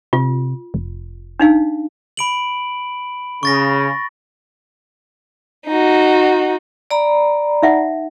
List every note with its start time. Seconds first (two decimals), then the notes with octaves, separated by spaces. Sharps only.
0.13 C3 F4
0.74 F1
1.39 D4 D#4 F5
2.17 B5 D7 F#7
3.43 C#3 C#6 A6 A#6
5.67 D#4 F#4
6.91 D5 A#5 B5
7.62 D#4 E5 F#5